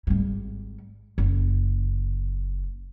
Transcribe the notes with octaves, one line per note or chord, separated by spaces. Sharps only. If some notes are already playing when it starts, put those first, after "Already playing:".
G#1 G3
F#1